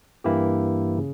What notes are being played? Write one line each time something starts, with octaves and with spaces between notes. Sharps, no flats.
G2 E3 A#3 E4 G4
C#3